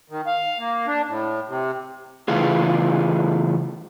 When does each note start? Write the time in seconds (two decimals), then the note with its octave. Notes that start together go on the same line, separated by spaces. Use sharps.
0.10 D#3
0.27 F5
0.58 A#3
0.87 D4
1.08 A2
1.48 C3
2.28 C#3 E3 A3 F4 G#4